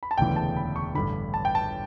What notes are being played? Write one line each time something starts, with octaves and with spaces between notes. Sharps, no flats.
B5
A5
E1 D2 C#3 E3 G5
A5
B5
C#6
A1 G2 D3 B5
A5
G5
A5